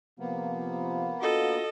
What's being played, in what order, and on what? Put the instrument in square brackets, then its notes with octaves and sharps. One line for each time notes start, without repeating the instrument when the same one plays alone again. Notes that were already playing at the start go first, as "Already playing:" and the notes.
[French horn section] C3 F3 [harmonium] A#3 B3
[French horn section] D4 F4 F#4 [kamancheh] A4 D#5